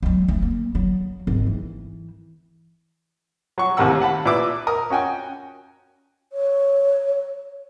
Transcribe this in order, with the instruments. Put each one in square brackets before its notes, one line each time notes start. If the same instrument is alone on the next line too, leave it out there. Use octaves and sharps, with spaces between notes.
[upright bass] F#3 G#3
A3
A#3
F#3
G#1
E3
[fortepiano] F#3 C#6
A1 D#2 C3 A#4 F#5 E6
F5 F#5 A5 B5
A#2 E4 B4 D6 E6
A#4 D#6
C#4 F#4 G5 G#5
[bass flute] C#5